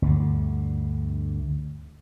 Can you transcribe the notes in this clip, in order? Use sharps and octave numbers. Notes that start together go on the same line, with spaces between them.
D2 G2 D3